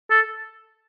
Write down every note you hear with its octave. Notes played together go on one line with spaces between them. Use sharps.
A4